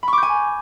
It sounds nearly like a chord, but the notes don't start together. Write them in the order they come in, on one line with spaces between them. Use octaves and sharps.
B5 C#6 D6 G6 G#5